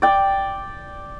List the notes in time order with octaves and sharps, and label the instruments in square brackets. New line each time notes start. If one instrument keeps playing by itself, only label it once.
[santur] D5 G5